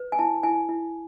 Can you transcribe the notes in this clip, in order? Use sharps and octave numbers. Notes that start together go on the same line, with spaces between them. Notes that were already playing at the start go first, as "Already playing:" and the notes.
Already playing: B4
G#5
E4 A5
E4 G#5
E4